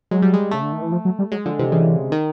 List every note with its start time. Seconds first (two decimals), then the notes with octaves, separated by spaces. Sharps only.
0.11 F#3 G#3
0.22 G3
0.33 G#3
0.51 C#3 A3
0.63 D3
0.73 D#3
0.82 E3
0.92 F3
1.05 F#3
1.19 G3
1.32 F#3 G#3
1.45 D3 F3
1.59 C3 E3
1.72 C#3 E3
2.12 D#3